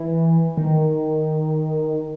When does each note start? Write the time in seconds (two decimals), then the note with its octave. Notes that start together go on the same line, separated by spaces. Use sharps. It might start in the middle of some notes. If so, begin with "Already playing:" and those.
Already playing: E3
0.57 D#3